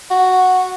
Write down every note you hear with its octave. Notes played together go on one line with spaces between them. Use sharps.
F#4